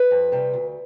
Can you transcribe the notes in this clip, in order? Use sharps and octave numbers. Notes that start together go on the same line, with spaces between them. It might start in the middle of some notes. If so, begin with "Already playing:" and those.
Already playing: B4
F2
C3 G3
D2